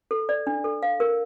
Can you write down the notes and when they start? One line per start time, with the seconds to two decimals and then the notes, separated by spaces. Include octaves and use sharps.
0.11 A4
0.29 D5
0.47 D4
0.64 A4
0.83 F5
1.00 A#4